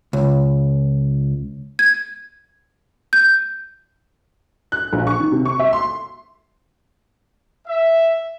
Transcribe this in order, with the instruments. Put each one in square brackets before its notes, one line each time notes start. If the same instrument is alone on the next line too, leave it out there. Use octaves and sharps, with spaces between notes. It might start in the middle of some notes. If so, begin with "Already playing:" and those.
[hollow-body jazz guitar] C#2
[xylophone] G#6
G6
[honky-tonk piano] F#6
A#1
C#6
D#3
C3
C#6
E5
C6
[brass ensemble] E5